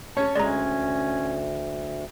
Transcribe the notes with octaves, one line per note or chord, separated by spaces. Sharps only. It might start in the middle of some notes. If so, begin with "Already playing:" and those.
C#4 C#5 A5
D2 G#3 C#4 D5 A#5